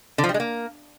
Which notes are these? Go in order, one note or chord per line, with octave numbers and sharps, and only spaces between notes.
D3
F3
G3
G#3
A#3